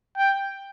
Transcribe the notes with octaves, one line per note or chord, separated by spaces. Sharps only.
G5